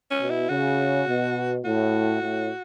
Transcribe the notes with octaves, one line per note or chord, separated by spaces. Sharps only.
C#4
B2
E4
C#3 F#4
B2
A2 F#4
A2